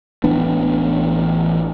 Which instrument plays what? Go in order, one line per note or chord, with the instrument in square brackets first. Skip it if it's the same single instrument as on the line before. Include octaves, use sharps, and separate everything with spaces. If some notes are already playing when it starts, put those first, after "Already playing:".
[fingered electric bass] A1 E3 B3 D4